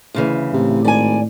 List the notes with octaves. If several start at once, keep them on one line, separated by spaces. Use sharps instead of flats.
D2 C#3 E3
A2 C3
G#1 D5 G#5